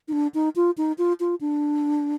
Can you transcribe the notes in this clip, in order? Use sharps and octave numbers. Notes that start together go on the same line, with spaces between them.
D#4
D4
D#4
F4
D#4
F4
F4
D4